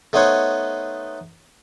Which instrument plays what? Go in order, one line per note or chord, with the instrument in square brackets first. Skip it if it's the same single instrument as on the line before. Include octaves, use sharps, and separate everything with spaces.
[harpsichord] A3 B3 D#4 C5 C#5 F#5